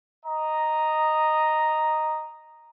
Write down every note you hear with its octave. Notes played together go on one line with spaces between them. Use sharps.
D#5 A#5